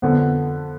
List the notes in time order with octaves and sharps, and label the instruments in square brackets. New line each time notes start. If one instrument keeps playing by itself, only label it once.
[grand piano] F2 D3 B3